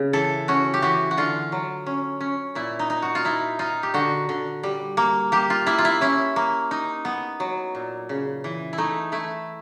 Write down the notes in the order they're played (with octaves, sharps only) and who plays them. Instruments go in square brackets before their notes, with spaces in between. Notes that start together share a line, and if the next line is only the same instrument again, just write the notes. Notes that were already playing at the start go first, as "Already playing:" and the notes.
Already playing: [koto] C#3
E3 A4
C#4 F#4
G4
E3 F#4
F#4
D3 F4
F#3
C#4
C#4
A#2 E4
D#4
D#4
F#4
F4
D#4 E4
D#4 F4
G4
D3 F#4
D3
G3
A#3
A#3 G4
F4
A#3 E4
F4
E4
C#4 E4
A#3
D#4
B3
F#3
A#2
C#3
E3
E4
A3 D#4
A3 E4